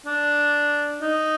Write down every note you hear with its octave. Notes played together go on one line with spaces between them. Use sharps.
D4
D#4